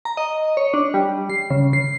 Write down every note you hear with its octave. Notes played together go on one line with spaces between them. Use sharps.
A#5
D#5
C#5
D4
G3
C7
C#3
C7